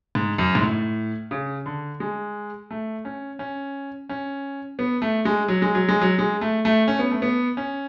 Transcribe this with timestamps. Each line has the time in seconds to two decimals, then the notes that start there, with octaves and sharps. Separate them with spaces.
0.15 G#2
0.38 F#2
0.55 G#2
0.62 A2
1.31 C#3
1.66 D3
2.00 G#3
2.71 A3
3.05 C#4
3.39 C#4
4.09 C#4
4.79 B3
5.02 A3
5.25 G#3
5.48 F#3
5.62 G#3
5.75 F#3
5.88 G#3
6.01 F#3
6.18 G#3
6.41 A3
6.65 A3
6.88 C#4
6.99 B3
7.11 A3
7.22 B3
7.57 C#4